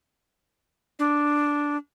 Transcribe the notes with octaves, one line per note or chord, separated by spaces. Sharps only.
D4